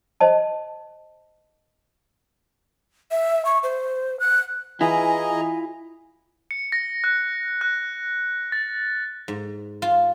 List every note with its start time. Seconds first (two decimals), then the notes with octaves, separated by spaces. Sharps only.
0.20 C5 D#5 A5
3.11 E5
3.45 C#6
3.63 C5
4.20 F#6
4.81 E3 E4 F4 G#4 D#5 G#5 A#5
6.51 C#7
6.72 A#6
7.04 F#6
7.61 F#6
8.52 A6
9.28 G#2
9.82 F4